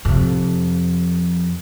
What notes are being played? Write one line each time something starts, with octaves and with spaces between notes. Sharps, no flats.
F2 C3